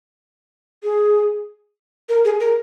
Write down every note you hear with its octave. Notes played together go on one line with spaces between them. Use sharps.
G#4
A#4
G#4
A#4